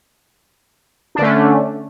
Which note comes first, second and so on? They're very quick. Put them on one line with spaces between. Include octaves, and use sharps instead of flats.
D4 D3 A3 C#4